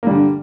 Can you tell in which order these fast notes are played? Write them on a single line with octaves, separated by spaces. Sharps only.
A#3 G3 D3